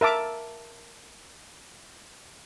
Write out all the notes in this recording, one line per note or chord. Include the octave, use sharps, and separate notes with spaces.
A#4 E5 A5 D6